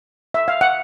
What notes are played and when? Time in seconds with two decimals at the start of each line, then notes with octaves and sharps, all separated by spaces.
0.34 E5
0.48 F5
0.61 F#5